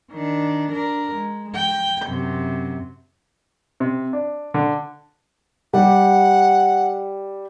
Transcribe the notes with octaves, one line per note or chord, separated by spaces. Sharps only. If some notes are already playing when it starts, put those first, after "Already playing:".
D#3 D4
D4 A#4
G#3
G5
F#2 C3
C3
D4
D3
G3 G4 F#5